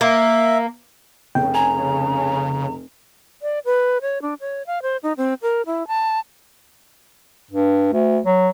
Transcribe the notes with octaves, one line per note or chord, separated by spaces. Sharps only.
A#3 E5
F1 C#3 G5
G#5 A#5
D5
B4
C#5
D4
C#5
F5
C5
D#4
C4
A#4
E4
A5
G2
D2
F#3